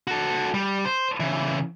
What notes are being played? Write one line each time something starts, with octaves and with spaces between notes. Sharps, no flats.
F#4 A4
G3
C5
C#3 E3